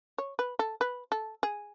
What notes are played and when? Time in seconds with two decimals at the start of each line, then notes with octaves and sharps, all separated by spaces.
0.18 C#5
0.39 B4
0.59 A4
0.81 B4
1.12 A4
1.43 G#4